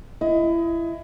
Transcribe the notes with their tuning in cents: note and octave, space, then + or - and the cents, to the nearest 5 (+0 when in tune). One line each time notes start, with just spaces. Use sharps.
E4 +25 D#5 +25